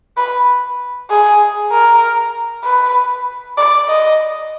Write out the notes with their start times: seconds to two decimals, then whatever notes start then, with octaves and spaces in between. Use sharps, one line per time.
0.17 B4
1.10 G#4
1.71 A#4
2.64 B4
3.57 D5
3.88 D#5